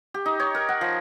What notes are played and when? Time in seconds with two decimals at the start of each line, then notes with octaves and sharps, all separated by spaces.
0.14 G4
0.26 D#4
0.40 C#5
0.55 A#4
0.69 F#5
0.81 F3